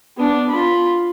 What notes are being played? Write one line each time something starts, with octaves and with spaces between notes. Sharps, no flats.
B3 D4
F4 B5